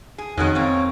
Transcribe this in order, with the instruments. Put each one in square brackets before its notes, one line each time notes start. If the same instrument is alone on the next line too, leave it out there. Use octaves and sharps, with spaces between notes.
[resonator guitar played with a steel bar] G#4
[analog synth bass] F2 [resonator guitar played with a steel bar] B2 D#3 G#3 [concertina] C#4 F#5 G#5 [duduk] D#4
[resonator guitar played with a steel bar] E2 A#3 [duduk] C4 [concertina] C#5